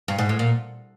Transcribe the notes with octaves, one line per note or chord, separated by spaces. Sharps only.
G2
G#2
A2
A#2